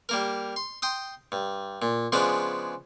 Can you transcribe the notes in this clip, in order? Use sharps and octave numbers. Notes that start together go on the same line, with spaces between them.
G3 A#3 A#4
C6
G5 C6 D#6
G2
A#2
C#3 F3 G#3 B3 D4